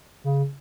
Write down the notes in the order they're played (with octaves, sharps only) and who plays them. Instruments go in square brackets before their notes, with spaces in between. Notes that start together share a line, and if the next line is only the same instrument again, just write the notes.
[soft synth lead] C#3